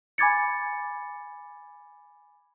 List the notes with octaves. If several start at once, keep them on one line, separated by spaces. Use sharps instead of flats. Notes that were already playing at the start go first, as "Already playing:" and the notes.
G#5 B5 D6 G#6 A6 C#7